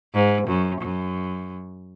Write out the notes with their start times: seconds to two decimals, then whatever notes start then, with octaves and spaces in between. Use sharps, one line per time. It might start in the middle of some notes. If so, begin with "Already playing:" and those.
0.14 G#2
0.48 F#2
0.81 F#2